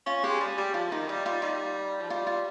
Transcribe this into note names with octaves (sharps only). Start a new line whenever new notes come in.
C#4 F4
G#3 G4
G3 G#4
G3 G4
F3 F4
D#3 D#4
G3 D#4
G3 F4
G3 D#4
F3
G3 F4
F4